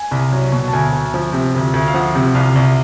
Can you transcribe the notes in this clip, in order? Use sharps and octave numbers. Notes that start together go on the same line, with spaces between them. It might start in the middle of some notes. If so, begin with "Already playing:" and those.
Already playing: G#5
C2
F#3
B2
A5
D2 G#5
D2
F3
C3
D2
D2
F5
F3 F#5
C3
C2 F5
C2